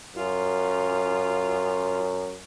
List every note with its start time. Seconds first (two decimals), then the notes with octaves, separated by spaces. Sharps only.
0.16 F#2 F4